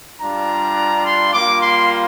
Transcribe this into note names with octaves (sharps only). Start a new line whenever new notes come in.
G3 D4 F4 A#5
C6
G3 A#3 F4 D6
C6